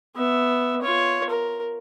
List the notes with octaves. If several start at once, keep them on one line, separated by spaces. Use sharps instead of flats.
B3 E5
F4 C#5
A#4